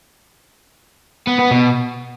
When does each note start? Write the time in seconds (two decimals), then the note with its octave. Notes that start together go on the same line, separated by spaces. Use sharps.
1.27 B3
1.39 B3
1.51 B2